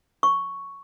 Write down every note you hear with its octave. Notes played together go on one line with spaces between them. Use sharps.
C#6